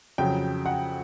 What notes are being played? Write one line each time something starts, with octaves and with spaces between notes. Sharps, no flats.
F2 C#3 F#3 G5
F#5